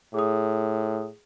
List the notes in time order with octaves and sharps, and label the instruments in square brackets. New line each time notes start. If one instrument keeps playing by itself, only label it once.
[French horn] A2 [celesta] G#4 D#6